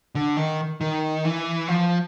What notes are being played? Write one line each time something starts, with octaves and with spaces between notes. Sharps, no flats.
D3
D#3
D#3
E3
F3